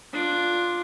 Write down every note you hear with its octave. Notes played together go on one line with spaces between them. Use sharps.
D4 F4